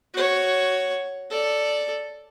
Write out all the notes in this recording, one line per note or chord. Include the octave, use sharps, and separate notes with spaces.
F#4 C#5
A4 D5